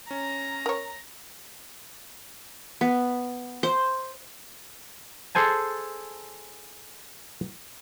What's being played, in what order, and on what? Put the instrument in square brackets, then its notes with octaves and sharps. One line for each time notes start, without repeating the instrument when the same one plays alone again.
[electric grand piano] C#4 [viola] A#5
[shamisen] A#4 C#5
[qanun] B3
C5
[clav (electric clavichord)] G#4 A4 C5 G#5 A5